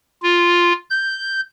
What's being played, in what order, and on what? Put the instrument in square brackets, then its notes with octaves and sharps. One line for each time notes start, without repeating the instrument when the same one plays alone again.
[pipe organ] F4
G6